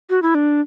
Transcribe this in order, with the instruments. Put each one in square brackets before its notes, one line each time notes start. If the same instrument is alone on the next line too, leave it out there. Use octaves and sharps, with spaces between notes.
[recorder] F#4
E4
D4